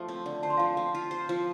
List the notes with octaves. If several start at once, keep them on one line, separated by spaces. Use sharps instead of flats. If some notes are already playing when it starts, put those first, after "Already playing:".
Already playing: F3 A3
C4
D3
C5 A5
C6
F3 F5 A5
C4
F4
C5
F3